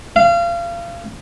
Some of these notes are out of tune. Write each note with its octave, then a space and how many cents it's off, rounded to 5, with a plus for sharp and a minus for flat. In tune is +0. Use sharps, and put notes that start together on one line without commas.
F5 -30